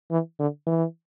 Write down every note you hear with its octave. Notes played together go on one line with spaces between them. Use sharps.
E3
D3
E3